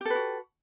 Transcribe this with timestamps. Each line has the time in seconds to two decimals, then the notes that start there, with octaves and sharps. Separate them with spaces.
0.01 G4
0.05 A4
0.10 B4
0.15 F#4